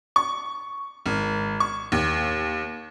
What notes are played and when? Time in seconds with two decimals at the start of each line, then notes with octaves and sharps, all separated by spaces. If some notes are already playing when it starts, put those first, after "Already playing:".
0.16 C#6
1.06 G#1
1.60 C#6
1.92 D#2